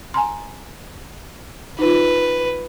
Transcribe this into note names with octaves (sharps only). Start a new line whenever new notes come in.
G#5 A#5 C6
D#4 F4 B4